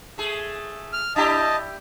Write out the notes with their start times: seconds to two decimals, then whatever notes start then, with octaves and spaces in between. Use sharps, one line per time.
0.18 A3 G#4
0.93 F6
1.16 D4 E4 G4 D#5 A5